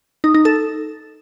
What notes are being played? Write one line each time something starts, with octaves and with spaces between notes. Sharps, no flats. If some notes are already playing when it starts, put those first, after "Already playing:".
D#4
D#4
A4